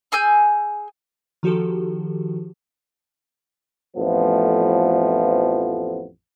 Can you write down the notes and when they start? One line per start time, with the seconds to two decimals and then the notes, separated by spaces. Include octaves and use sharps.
0.12 G#4 G#5 E6 G6
1.43 D#3 F3 F#4 G4 A4
3.97 A1 F2 F3 A3 B3